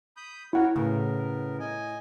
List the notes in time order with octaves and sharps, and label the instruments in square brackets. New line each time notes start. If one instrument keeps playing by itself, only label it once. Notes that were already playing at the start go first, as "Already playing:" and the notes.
[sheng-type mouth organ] B5 D#6 G6
[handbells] E4 F#5 [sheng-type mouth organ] F#4 A#4 C#5
[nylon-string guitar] A2 [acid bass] C#3 [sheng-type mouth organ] B3 A#4
[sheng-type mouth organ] D#5 G#5